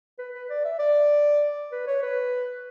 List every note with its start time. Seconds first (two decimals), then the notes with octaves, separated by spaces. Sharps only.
0.18 B4
0.34 B4
0.50 D5
0.65 E5
0.79 D5
1.72 B4
1.87 C#5
2.02 B4